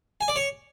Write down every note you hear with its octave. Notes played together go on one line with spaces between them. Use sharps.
G#5
D5
C#5